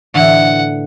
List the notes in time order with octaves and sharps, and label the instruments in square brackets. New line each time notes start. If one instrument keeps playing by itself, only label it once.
[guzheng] A2 D3 E3 [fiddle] F#5